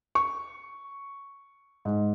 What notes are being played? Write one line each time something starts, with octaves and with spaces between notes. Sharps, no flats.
C#6
G#2